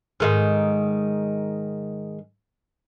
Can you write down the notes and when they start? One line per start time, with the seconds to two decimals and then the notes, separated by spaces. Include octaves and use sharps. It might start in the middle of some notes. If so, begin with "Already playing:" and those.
0.20 G#2 D#3 G#3